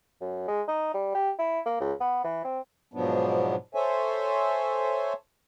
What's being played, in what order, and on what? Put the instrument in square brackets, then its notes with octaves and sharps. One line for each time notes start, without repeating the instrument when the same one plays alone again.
[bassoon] F#2
G#3
D#4
G3
G4
E4
A#3
C#2
B3
E3
C4
[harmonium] G#2 B2 F3 F#3 B3 D4
A4 C5 C#5 E5 G#5